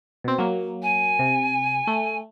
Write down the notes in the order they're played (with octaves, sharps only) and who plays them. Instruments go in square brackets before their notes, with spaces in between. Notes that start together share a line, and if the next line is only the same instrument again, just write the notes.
[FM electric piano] B2 C4
F#3 A#3
[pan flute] G#5
[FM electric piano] C3
A3